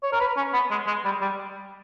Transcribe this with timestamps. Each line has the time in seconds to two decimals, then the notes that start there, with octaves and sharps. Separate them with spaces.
0.03 C#5
0.13 A#4
0.20 B4
0.37 C#4
0.53 B3
0.71 G#3
0.87 G#3
1.05 G3
1.21 G3